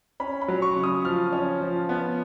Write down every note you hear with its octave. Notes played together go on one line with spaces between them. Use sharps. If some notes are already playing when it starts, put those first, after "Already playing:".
C#4 B5
B5
F#3
C#6
C#3
D#6
F3 F6
C#4
F3
B3